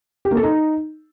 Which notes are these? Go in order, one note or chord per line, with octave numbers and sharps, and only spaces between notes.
G4
A#3
A4
D#4